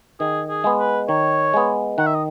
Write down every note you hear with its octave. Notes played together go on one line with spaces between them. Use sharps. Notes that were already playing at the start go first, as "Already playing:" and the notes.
D#3 G#4
G#4
G#3 B3
B4
D#3 C#5
G#3 B3
D#3 F#5
E5
D#5